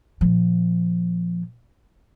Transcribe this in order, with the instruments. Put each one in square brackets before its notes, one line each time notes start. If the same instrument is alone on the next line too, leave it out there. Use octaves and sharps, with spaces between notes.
[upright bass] A#2 F3